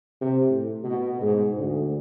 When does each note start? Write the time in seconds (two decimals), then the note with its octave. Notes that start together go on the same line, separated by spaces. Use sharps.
0.21 C3
0.50 A2
0.84 B2
1.21 G#2
1.58 D2